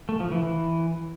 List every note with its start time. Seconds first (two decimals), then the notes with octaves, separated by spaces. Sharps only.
0.09 A3
0.20 F3
0.32 E3
0.43 E3